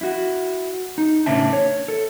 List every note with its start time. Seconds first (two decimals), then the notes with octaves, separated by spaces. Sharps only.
0.01 E4 F#4
0.98 D#4
1.26 A2 C#3 C#4 D4 E5 A5
1.53 C#5
1.88 A4